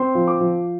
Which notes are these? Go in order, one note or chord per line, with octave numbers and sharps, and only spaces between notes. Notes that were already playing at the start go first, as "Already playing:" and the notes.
Already playing: C4 C6
F3
D6
F3